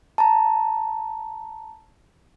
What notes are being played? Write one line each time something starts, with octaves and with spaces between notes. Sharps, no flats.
A5 A#5